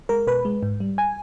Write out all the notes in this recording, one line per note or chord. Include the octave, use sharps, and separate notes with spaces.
G#3 A#4
B2 B4
G#3
G#2
G3
G#5